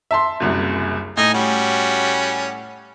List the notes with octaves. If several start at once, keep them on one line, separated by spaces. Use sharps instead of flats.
E5 A5 C6
F#1 C2 F#2
A2 D#4 D#5 G#5
G3 C#4 F#4